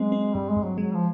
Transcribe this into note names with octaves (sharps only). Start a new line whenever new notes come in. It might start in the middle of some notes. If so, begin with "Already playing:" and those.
Already playing: F#3 G#3 C4
C4
G2 G3
G#3
G2
F#3
F#3 G#3
F3